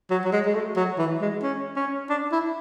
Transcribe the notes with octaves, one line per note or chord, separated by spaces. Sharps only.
F#3
F#3
G#3
G#3
A3
F#3
E3
G#3
C#4
C#4
D4
E4